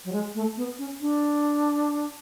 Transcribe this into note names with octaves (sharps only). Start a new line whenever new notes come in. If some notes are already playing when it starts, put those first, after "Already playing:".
F#3
G#3
A3
B3
C#4
D4